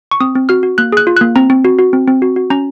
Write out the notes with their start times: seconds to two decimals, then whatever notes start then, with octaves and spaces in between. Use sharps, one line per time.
0.11 C#6
0.20 C4 D#6
0.35 C4
0.49 F#4 F6
0.63 F#4
0.78 A#3 F#6
0.92 G#4 F#6
1.07 F4
1.17 A#3 F#6
1.36 C4 A#5
1.50 C4
1.65 F#4
1.79 F#4
1.93 C4
2.08 C4
2.22 F#4
2.36 F#4
2.50 C#4 A#5